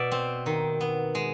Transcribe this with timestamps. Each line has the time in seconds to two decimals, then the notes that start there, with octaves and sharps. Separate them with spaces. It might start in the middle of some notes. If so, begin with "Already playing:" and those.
Already playing: B2 D5 E5
0.12 C4
0.46 D#3
0.81 B3
1.15 G#3